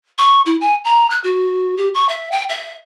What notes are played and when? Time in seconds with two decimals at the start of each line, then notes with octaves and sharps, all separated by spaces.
0.18 C#6
0.46 E4
0.61 G#5
0.84 A#5
1.10 F#6
1.24 F#4
1.77 G4
1.94 C#6
2.09 E5
2.31 G5
2.49 E5